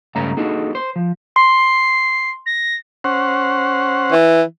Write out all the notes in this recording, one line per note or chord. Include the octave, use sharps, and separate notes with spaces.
C#2 G2 A3 C#4 A#5
A#3 D4 D#4 F#4 G#4 A4
C5
F3
C6 C7
A#6
C#4 C5 F#5
E3